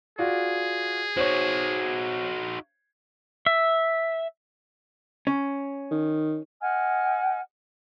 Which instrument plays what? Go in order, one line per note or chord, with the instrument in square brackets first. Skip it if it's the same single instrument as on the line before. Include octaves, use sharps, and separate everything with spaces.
[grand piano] F4 F#4 D5 [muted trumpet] G#4
[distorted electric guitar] D#4 F#4 [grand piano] C5 C#5
[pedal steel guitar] E5
[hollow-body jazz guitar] C#4
[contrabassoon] D#3
[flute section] D#5 F#5 G#5 F6